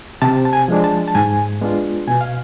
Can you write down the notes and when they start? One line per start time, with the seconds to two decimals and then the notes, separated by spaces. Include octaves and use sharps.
0.22 C3 A5
0.45 A5
0.53 G#5
0.68 F3 G#3 D4
0.84 A5
1.08 A5
1.15 G#2 G#5
1.61 G#3 B3 D4 F4
2.08 B2 G#5
2.21 F5